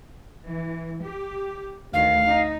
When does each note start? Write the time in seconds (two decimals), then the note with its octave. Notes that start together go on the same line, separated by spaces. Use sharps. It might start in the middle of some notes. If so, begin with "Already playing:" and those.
0.45 E3
1.02 G4
1.93 D2 D#3 F5
2.25 D#4